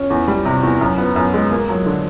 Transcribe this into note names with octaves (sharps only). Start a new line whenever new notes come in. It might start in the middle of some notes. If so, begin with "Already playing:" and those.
Already playing: C#4
E2
G3
C3
E2
F#2
B3
F#2
G#3
A#3
F#3
D3